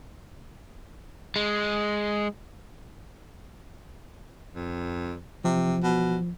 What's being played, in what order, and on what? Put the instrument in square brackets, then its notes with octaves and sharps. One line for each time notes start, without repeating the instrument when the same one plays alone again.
[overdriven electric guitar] G#3
[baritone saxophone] F2
[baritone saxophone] C3 [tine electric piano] F3
[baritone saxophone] B2